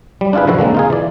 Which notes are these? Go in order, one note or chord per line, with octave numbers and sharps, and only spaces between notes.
G3
D4 E4 F4 G#4 B4
D3 D#3 F3 F#4 A4
D3 G#3 A#3 C4
D#4 F4 G#4
E3 D5